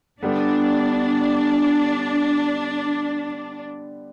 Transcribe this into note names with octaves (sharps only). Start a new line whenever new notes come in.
D3 G3 B3 D4